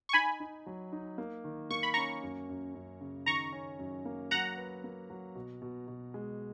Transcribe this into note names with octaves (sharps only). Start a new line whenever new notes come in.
C#6
D#4 G#5 B5
D#4
F#3
D#4
A#3
D#3
A#3 C#6
B5
C#4 A#5 C#6
F#2
F#2
F#2
C#3
D#3 A#5 C#6
C#4
F#2
A#3
F#3 F#5 A#5
B4
A#3
F#3
B2
B2
B2
G#3